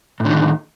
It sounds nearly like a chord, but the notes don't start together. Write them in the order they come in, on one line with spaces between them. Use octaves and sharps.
A2 D3 D#3